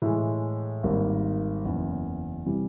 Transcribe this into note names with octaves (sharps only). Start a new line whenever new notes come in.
A2 E3 G#3
G#1 G#2 D#3 G3 A#3
F#1 E2 C#3
C3 E3 G3